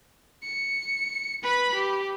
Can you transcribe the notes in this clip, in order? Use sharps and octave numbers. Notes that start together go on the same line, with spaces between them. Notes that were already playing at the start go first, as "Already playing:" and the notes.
C#7
B4 B5
G4